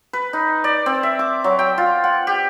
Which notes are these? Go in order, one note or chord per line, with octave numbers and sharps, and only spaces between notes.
B4
D#4
D5
C4
E5
D6
F#3
G5
F4
F#5
G4